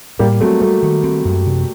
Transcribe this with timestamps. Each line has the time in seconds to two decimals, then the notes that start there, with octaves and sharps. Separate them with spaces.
0.19 A2 G3 A#3
0.41 F#3 A3 C4
0.61 F#3 G3 A3
0.83 D#3
1.03 C4
1.25 F#2
1.46 C3